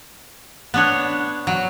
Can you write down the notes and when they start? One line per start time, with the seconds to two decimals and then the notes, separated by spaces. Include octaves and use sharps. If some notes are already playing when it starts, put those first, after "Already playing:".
0.74 B3 D4 C#5
1.47 F#3